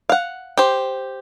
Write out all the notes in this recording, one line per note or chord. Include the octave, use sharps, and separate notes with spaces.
F5 F#5
G4 C5